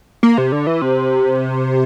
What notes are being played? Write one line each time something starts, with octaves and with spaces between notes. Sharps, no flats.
A#3
C3
D3
E3
C3